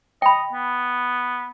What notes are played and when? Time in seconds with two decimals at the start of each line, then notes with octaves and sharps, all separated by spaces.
0.22 D#5 G5 B5
0.53 B3